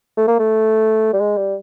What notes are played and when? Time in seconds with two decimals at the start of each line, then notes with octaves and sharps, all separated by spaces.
0.17 A3
0.28 A#3
0.39 A3
1.13 G3
1.20 G#3
1.37 G3